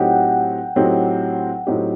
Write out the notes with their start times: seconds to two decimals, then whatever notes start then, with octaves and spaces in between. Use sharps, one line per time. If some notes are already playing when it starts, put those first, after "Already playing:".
Already playing: A2 F#3 C4 D#4 G4 F#5 G5
0.76 A2 F#3 C4 D#4 G4
1.67 A2 F#3 C4 D#4 G4